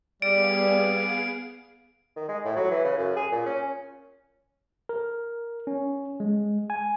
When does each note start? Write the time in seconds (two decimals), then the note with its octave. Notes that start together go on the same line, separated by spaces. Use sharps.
0.22 G3 B3 G#4 D5 F5 D7
2.16 D#3
2.28 G#3
2.44 A2
2.56 F#3
2.71 E3
2.84 C#3
2.98 F#2
3.16 G#4
3.32 A#2
3.46 C#4
4.89 A#4
5.67 C#4
6.20 G#3
6.70 G#5